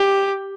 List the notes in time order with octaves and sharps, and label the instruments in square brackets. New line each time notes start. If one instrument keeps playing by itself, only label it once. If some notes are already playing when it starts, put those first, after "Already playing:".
Already playing: [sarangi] G4